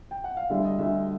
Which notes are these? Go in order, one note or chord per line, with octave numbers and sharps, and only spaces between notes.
G5
F#5
F5
D2 D3 G3 E5
D#5
D2 D3 G3 E5